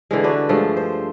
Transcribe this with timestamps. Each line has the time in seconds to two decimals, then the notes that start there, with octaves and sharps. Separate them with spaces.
0.11 D3 E3 G#3
0.24 D4 F#4 B4
0.49 G2 F3 G#3 A3
0.77 C5